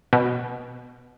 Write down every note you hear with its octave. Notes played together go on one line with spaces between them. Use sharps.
B2